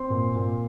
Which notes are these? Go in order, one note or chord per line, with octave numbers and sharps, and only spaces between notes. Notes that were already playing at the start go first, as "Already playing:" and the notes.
Already playing: C4 C6
A#2
A#2